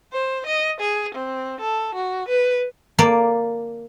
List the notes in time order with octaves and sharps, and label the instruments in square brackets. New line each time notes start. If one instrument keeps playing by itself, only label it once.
[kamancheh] C5
D#5
G#4
C4
A4
F#4
B4
[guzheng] A#3 D5